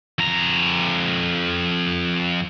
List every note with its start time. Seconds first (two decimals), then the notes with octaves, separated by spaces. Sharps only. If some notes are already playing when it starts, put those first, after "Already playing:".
0.19 F2 A#5